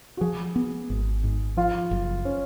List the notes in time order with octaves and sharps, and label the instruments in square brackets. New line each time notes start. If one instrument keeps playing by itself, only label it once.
[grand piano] F#4
[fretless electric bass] F3 [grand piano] G#4
[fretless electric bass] B3
G#1
G#2
[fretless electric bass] F3 [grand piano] F4
[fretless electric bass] F#1
[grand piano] C#4